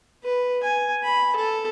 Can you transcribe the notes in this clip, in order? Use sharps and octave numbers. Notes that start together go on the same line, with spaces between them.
B4
G#5
B5
A4